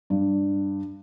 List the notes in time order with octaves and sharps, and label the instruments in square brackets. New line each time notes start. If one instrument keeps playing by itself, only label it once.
[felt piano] G2